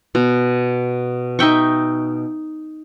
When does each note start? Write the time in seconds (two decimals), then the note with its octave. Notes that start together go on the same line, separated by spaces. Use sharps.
0.15 B2
1.39 D#4 E5 G5 C#6